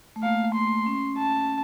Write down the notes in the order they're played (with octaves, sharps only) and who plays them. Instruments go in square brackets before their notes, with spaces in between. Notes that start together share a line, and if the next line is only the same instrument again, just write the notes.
[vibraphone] A3
[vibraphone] A#3 [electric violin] F5
[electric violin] C6
[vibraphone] C#4
[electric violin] A5